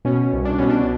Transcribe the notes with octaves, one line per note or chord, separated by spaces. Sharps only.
B2 C#4
C2
D4
B2 C#4
D4